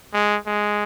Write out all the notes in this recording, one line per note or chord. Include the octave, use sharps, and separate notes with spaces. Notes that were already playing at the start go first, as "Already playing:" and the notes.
G#3
G#3